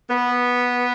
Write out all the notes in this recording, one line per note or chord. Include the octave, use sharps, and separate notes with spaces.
B3